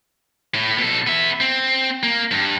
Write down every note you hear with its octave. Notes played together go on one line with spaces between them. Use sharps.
A2
B2 A4
B3 E5
C4
A#3
G2